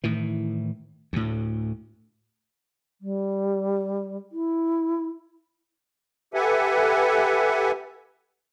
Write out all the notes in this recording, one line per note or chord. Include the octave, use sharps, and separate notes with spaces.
A2 D#3 E3
D2 A2
G3
E4
G4 A4 B4 E5 F#5 G#5